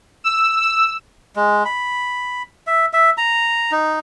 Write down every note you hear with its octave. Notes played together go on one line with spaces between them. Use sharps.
E6
E6
G#3
B5
E5
E5
A#5
D#4